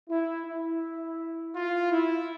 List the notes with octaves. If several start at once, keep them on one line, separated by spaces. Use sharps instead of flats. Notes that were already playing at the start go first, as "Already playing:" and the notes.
E4
E4
F4
E4